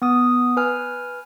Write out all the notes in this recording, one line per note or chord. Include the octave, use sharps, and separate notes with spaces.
B3 D#6
B4 G#5 F6